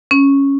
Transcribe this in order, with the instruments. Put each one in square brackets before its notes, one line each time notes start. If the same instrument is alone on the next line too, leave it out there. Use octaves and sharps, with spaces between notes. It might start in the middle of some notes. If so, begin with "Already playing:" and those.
[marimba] C#4